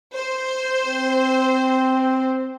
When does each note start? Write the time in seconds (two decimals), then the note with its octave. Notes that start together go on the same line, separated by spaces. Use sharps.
0.14 C5
0.87 C4